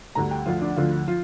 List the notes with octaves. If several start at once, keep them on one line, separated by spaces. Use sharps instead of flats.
D2 D3 G3 A#5
G5
D2 D3 F3 F4
D4
D2 D3 F3 F4
F3 F4